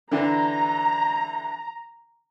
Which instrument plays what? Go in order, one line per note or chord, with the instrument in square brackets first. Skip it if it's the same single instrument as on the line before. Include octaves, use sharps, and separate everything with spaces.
[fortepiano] D3 E3 D4 [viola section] A#5